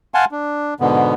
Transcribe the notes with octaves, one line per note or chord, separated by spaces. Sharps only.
F5 F#5 G#5 A5 C6
D4
G#2 B2 D3 B3